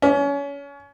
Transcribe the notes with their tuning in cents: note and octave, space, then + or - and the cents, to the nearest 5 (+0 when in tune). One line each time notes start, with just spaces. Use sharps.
C#4 +30